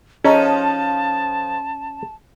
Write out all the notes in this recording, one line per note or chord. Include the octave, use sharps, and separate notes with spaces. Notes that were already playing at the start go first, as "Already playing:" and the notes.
F3 C#4 D#4 G#4 A4 D#5 A5 A#5